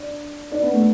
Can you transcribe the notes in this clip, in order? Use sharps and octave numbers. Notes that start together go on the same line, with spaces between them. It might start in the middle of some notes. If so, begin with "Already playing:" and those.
Already playing: D4
D4
B3
A3